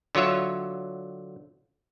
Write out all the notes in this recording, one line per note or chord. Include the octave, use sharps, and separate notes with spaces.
D3 F#3 F4 C#5 E5